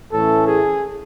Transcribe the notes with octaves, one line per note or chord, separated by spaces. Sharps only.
A2 E3 A3 C#4 A4
G#4